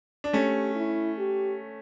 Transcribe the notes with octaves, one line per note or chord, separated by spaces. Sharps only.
D4
A3 C#4 G4
E4
G4